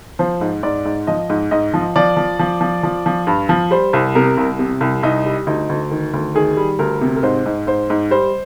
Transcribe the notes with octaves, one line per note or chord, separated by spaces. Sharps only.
F3 C5
G#2
G#2 D5
G#2
F3 D#5
G#2
G#2 D#5
F3
F3 D5
F3
F3
F3
F3
F3
G2
F3
G3 C5
C2
C3 A#4
C2
C3
C2
C2 D#4
G3
D2 D#4
D2
D#3
D2
D#3 G#4
G3
D2 A#4
C3
A#4
G#2 C5
G#2
G#2 C5
G#2
G3 C5